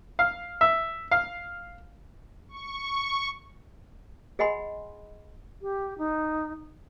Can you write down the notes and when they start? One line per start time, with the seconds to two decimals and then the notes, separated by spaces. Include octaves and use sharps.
0.19 F5
0.61 E5
1.11 F5
2.49 C#6
4.39 G#4 D#5 F#5 G#5 B5 C6
5.62 G4
5.98 D#4